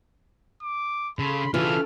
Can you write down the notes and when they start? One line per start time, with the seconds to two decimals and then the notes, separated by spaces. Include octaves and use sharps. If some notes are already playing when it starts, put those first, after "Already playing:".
0.62 D6
1.19 C#3 A4 B5 C6
1.54 C#3 E3 D4 F4 F#4 A4 B4 F6